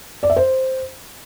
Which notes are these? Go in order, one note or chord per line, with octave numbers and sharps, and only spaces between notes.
D5
E5
C5